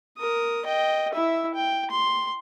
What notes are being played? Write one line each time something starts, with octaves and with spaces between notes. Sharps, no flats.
A#4 D#6
D#5 G5
E4 E5
G5
C6